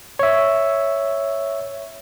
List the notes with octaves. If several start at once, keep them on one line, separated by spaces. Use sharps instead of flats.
C#5 E5